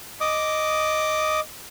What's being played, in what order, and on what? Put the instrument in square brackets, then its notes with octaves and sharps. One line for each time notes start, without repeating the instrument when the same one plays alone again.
[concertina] D#5 D6 D#6